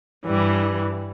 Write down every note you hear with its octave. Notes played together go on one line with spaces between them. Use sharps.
G2 E3 G3